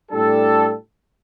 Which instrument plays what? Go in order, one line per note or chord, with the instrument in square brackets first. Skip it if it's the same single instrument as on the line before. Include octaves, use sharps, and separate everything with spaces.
[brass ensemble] A2 G3 D4 A4